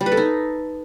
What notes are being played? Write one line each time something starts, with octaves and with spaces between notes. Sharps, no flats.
G3
B4
A4
D#4